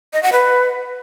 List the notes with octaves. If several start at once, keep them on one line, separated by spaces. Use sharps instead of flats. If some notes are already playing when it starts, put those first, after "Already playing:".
D#5
F#5
B4